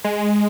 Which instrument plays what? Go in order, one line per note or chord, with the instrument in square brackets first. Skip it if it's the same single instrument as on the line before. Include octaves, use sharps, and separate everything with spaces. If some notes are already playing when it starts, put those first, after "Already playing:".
[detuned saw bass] G#3